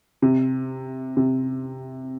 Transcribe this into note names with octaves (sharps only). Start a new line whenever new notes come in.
C3
C3